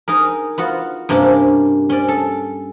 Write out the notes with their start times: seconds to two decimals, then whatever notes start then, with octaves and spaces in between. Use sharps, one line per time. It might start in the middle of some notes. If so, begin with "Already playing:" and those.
0.08 D#4 G#4 A#4
0.58 B3 F4 F#4
1.09 G2 C3 A#3 C#4 D4
1.90 C#4 D5
2.08 A4